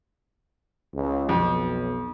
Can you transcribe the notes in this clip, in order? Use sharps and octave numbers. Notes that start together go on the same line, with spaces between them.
C#2
B1 F2